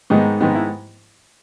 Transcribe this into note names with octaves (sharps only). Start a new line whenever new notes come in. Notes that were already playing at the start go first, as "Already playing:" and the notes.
G#2 D#3 G#3 B3
G#2 D#3 G#3 B3
E4